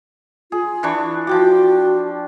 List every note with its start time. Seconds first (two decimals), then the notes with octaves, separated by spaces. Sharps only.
0.52 F4 G#4
0.83 E3 D4 C#6
1.27 F3 F#4 G5 D6